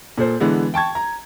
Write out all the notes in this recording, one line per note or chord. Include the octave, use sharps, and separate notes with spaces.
A#2 A4 C5
D3 E3 G#3 B3
G5 A5 C#6 G#6
A#5